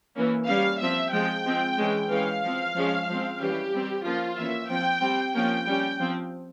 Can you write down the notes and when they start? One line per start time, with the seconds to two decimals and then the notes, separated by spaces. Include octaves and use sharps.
0.15 E3 A#3 C#4
0.48 G3 A#3 C#4 F5
0.80 F3 C4 E5
1.13 F3 G#3 C4 G5
1.46 F3 G#3 C4
1.78 E3 G#3 C#4
2.10 E3 G#3 C#4 F5
2.43 F3 C4
2.75 F3 G#3 C#4
3.07 F3 G#3 C4
3.39 E3 G3 C#4 G4
3.72 G3 C4
4.04 F3 A#3 C#4 F4
4.37 E3 A#3 C#4 E5
4.69 F3 C4 G5
5.02 G3 C4
5.35 F3 A#3 C#4 G5
5.67 G3 C#4
5.99 F3 C4